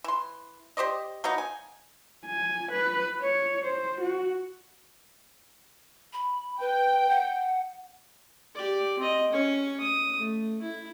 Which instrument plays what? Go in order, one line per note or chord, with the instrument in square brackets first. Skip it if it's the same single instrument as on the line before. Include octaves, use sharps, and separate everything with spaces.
[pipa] E3 C6
G4 C5 D5 D#5
F#3 A#3 B3 D#4
G#5
[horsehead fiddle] G#5
B4
C#5
C5
F#4
[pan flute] B5
[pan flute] B4 [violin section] G5
[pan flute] F#5
[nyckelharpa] G4 D5
C4 D#5
C#4 C#5
D#6
A3
E4